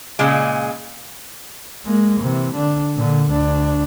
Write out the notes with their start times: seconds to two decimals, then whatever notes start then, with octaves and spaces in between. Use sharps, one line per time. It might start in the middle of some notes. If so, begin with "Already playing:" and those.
0.19 A#2 C#3 G#3
1.85 G#3 A#3
2.20 C3 E3
2.54 D3 D4
2.96 A#2 D3
3.30 D2 D4